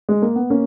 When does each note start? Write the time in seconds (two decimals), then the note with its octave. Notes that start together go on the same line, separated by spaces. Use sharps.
0.09 G#3
0.22 A#3
0.35 B3
0.50 A#3 C#4